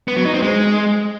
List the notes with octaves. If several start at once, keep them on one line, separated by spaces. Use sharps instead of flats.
B3
F#3
D#4
C4
G#3